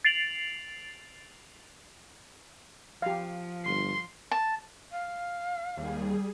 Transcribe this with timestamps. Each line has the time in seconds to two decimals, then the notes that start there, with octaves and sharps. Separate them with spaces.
0.05 A6 C7 D7 F7 F#7
3.02 F3 G4 F5
3.65 G1 C6
4.31 A5
4.92 F5
5.77 D#2 G3 G#4